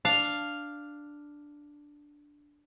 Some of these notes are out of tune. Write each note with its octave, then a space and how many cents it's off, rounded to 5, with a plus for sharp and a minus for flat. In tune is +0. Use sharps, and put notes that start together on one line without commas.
D4 +0 F5 +0